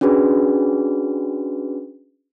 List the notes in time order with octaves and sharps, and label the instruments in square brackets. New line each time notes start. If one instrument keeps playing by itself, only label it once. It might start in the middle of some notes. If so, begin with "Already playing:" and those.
[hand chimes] C#4 D4 F#4 G#4 B4